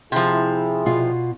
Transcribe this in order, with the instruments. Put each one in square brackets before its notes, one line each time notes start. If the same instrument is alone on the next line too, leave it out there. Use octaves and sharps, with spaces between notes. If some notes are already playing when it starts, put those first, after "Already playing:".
[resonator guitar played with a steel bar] C3 F3 [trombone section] E4 G#4
[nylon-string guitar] B2 F4